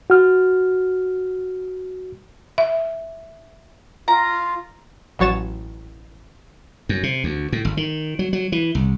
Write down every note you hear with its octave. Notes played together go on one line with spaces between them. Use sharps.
F#4 F6
E5
F4 A#5
A1 F#3 C#5 A6 E7
F#2
C3
D2
A2
G#1
D#3
F#3
F#3
E3
C2